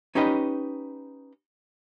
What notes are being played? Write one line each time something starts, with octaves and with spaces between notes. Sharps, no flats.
C#4 D#4 G4 B4 D#5